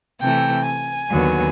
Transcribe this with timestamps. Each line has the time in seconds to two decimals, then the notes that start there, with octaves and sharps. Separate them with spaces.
0.20 C3 E3 A3 G5
0.66 G#5
1.11 D#2 D3 F#3 B3